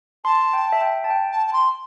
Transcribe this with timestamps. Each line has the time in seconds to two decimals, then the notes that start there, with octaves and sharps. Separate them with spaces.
0.25 A5 C6
0.53 G5
0.72 E5
0.81 G5
1.04 A5
1.10 G5
1.32 A5
1.47 A5
1.53 C6